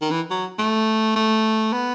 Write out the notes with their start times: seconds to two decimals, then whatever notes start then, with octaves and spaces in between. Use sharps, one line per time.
0.02 D#3
0.11 E3
0.31 F#3
0.59 A3
1.16 A3
1.73 B3